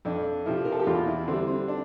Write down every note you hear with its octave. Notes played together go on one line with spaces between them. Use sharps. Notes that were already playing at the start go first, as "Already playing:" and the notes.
F2 D4
C3 F3 E4
A#4
A4
G4
E2 F4
E4
D3 G3 C4
C4
D4